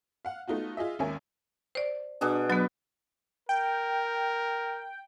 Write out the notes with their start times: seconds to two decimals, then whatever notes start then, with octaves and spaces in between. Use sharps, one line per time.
0.25 F5 F#5
0.48 A3 B3 D#4 F4 F#4
0.77 F4 G#4 D#5 E5
0.99 G#1 D#2 C#4 A#4 E5 G#5
1.75 C5 D5
2.21 B2 D4 G#4
2.50 F#3 B3 B4
3.49 A#4 G5